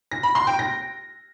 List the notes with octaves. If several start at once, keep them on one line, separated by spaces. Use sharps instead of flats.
A#6
B5
C6
G5
A#6